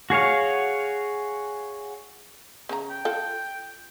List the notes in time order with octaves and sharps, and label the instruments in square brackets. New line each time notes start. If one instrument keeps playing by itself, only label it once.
[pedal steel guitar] F#4 G#4 C#5 F5
[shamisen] C#3 C#4 A#5
[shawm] G5
[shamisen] F4 A4